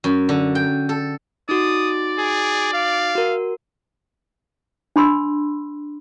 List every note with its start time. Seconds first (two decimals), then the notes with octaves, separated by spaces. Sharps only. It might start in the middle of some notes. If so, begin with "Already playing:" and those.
0.04 F#2
0.29 D3
0.55 G5
0.89 A4
1.49 D#4 F#4 D5 D#6
2.18 G#4
2.73 F5
3.15 F#4 A#4
4.96 D4 B5 C6 E6